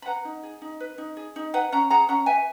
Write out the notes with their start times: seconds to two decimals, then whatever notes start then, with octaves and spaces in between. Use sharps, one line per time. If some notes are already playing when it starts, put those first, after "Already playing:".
0.02 B5
0.06 B4 F#5 A#5
0.25 D#4
0.43 G#4
0.62 D#4
0.80 B4
0.98 D#4
1.17 G#4
1.36 D#4
1.54 B4 F#5 A#5
1.72 C#4 F#5 A#5
1.90 G#4 F#5 A#5
2.08 C#4 F#5 A#5
2.26 B4 E5 G#5